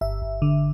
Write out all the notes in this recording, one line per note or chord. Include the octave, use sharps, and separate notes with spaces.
G1 E5
G1
D3